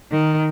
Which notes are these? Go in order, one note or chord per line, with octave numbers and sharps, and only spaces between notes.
D#3